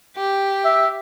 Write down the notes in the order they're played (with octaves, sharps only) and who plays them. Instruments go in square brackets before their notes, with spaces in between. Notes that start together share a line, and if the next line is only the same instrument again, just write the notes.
[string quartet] G4
[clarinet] E5